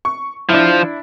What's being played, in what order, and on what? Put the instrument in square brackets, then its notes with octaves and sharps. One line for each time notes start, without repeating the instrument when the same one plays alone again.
[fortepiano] C#6
[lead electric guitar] F3 [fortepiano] D4 E4